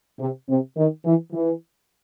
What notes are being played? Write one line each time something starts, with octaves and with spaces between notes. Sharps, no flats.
C3
C3
D#3
E3
E3